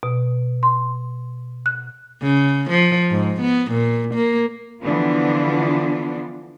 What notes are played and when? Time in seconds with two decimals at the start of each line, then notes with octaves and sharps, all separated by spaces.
0.03 B2
0.63 C6
1.66 F#6
2.22 C#3
2.70 F3
3.11 G#2
3.41 B3
3.71 A#2
4.15 A#3
4.83 D3 E3 F3 B3 D4 F4